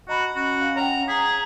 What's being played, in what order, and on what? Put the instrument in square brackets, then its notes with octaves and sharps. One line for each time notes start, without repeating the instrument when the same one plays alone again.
[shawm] F#4 [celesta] D#5 A#5 B5
[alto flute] C#4 [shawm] F#4
[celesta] F5
[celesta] C#5 F#5 G5 [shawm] A#5
[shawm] G#4 [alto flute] A#5 [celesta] B6